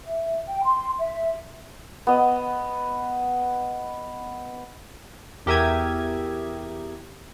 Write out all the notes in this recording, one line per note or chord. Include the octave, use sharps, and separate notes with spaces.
E5
G5
C6
E5
B3 D#5
E2 G4 A#4 E5 D#6 G#6